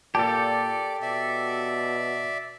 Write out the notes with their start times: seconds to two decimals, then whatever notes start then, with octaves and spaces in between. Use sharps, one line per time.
0.15 A#2 G4 A4 D5 A5
1.02 B2 D5 E5